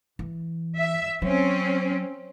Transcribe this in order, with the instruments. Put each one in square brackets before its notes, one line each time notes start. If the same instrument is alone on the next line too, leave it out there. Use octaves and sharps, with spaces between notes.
[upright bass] E3
[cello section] E5
[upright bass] F#3 [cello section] C4 C#4